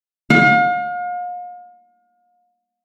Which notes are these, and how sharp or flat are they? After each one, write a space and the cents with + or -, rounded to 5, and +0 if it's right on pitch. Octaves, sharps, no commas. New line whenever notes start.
F5 +40